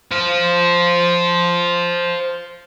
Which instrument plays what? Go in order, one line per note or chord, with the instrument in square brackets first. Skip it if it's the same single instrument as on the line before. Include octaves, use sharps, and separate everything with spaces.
[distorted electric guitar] C5 F5